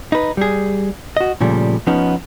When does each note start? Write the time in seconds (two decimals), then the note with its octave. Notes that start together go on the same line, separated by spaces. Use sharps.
0.12 D#4 B4
0.37 G3 G#4
1.17 F#4 D#5
1.41 A#2 C#3 F3 G3 A3
1.87 F3 B3 C#4 D#4